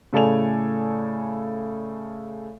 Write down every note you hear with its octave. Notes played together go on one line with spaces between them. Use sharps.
A2 C#3 A4 D5 G#5 F7